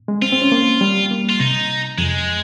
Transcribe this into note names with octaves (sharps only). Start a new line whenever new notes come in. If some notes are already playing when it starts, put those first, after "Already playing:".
G#3
C4 F4
C4
C#4
A#3
G3
A#3
F4
C3 D#4
F2 G#3